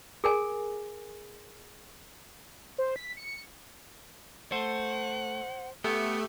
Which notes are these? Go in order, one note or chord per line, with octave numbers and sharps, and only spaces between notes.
G#4 A#4 G#5
C5
B6
C#7
A3 C5 F#5
A3 B3 G4